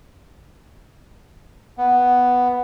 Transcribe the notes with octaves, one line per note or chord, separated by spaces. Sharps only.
B3